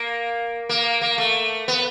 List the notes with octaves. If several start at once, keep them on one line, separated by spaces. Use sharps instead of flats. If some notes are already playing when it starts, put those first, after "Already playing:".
Already playing: A#3
A#3
A#3
A3
B3